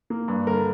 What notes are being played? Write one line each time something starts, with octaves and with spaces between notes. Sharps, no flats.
A#3
G2
D3 A#4